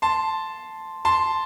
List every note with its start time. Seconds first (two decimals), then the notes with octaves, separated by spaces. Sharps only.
0.02 A5 C6
1.05 A5 C6